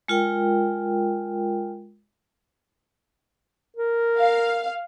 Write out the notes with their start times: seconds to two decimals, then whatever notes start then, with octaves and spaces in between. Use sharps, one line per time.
0.08 G#3 F4 A#4 G5
3.77 A#4
4.19 F5